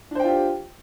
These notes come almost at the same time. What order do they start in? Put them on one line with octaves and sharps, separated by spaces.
D4 C5 G5 F4 G4